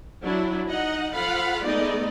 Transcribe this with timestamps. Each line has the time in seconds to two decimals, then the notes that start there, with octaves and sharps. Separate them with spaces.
0.23 F#3 D4 E4
0.69 D#4 D#5 F#5
1.14 F3 F4 A4 F5 F#5 B5
1.64 G#3 A3 B3 D#4 D5 D#5